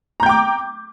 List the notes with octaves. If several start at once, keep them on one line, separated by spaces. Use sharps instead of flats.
G5 A#5 D6 G6